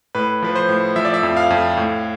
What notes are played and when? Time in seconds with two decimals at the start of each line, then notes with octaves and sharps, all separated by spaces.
0.15 A2 B4
0.42 F3 B4
0.55 C5
0.69 A2
0.96 F3 E5
1.05 D5
1.14 E5
1.23 F2
1.37 F5
1.50 F2
1.77 A2